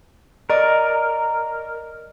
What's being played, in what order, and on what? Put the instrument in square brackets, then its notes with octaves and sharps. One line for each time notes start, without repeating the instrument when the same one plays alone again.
[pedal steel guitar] A#4 [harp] D5 D#5 C#6